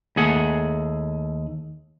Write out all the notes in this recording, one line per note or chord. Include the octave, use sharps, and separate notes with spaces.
D#2 A3 G#4 F#5